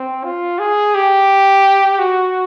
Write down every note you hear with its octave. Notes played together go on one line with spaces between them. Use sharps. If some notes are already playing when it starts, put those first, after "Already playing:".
Already playing: C4
F4
G#4
G4
F#4